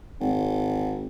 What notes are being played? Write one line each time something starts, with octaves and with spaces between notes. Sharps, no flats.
G#1